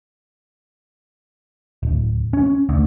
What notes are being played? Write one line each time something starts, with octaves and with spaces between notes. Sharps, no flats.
D1
C#4
D2